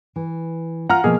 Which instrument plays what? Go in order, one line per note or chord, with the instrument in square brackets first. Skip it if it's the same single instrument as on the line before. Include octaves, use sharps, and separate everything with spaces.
[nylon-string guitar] E3
[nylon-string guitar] F4 [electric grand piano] F#5 A#5 F6
[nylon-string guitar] B2 F3 [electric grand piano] A#3 G#4